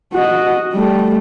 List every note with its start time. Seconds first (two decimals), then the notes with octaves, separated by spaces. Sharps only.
0.13 F#4 D#5
0.73 G3 A3